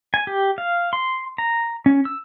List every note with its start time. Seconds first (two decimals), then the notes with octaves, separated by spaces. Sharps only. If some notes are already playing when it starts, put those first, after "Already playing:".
0.14 G#5
0.27 G4
0.58 F5
0.93 C6
1.38 A#5
1.86 C#4
2.05 E6